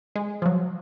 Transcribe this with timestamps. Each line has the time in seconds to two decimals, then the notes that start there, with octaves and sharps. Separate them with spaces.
0.16 G#3
0.42 F3
0.46 F#3